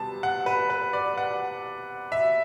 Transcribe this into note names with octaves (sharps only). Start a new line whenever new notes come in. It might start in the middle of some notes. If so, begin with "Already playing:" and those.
Already playing: C3 G3 B3 A5
F#5
B4
B4
D5
F#5
E5